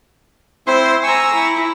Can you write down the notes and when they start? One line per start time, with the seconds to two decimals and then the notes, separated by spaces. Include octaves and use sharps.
0.67 C4 E4 C5 C6
1.03 G#5 A#5 C#6 E6
1.35 E4